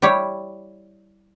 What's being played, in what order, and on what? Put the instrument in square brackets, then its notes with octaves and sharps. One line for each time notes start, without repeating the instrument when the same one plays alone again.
[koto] G3 E4 G4 C#5